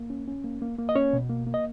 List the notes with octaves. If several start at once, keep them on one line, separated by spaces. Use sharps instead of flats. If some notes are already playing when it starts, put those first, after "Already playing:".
Already playing: A#3
C#4
C#4
A#3
A#3
A#3
D#5
C#4 C#5
B2
A#3
A#3
D#5